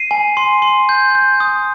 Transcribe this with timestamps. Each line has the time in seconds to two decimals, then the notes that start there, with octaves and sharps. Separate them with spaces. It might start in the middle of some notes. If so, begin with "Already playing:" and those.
Already playing: C7 D#7
0.11 G#5
0.37 C6
0.62 C6
0.89 G6
1.15 G6
1.40 D#6